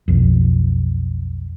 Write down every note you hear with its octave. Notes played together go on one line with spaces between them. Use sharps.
B1 F2